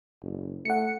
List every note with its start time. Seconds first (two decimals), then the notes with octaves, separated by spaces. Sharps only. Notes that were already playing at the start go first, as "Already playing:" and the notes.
0.22 F#1
0.65 A3 F#5 C#7